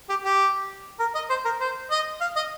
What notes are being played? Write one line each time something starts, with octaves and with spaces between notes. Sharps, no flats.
G4
G4
A#4
D#5
C5
A#4
C5
D#5
F5
D#5